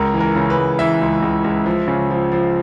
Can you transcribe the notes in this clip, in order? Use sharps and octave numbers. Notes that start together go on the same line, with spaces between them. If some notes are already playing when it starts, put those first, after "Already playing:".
Already playing: C#2 A#4
E3
A#4
C#3
B4
C#2
E3 E5
C#2
C#2
C#2
F3
C#3
F3
F3